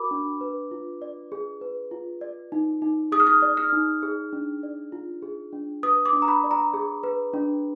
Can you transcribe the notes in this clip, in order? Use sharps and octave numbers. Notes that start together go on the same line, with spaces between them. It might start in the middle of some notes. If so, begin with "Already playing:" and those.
Already playing: F#4 A#4 B5 D6
D4
B4
F4
D5
G#4
B4
F4
D5
D#4
D#4
G#4 D#6
F6
D#6
D5
F6
D#4
G#4
D4
D5
F4
G#4
D4
B4 D#6
D6
D4
A#5
B5
D5
A#5
G#4
B4
D4